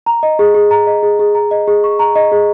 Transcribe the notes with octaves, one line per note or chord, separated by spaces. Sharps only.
A#5
D#5
G#4
G#4
A#5
D#5
G#4
G#4
A#5
D#5
G#4
C#6
A#5
D#5
G#4